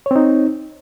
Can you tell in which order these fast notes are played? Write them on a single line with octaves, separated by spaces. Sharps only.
C#5 C4 D#4